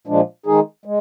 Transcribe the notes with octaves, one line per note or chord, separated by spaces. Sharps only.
A#2 F3 G#3 D4
D#3 G#3 D#4 G#4
G#3